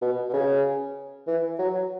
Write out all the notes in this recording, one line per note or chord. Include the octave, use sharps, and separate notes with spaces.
B2
B2
C#3
E3
F#3